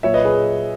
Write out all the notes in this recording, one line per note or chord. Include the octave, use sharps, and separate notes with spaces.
A#2 F#3 C#5 E5
B4 D#5
G#4 B4